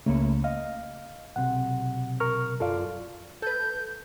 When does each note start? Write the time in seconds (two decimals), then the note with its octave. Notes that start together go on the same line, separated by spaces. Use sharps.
0.06 C#2 C#3 A3 A#3 C#5
0.44 D#5 F5
1.36 B1 C3 F#5
2.20 A#4 C#6 F6
2.60 F#2 F4 A4 D5 F5
3.42 A4 B4 G6